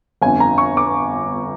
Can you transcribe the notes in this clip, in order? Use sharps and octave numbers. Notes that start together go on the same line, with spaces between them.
G1 F2 D3 G#5
A#5
C#6
D6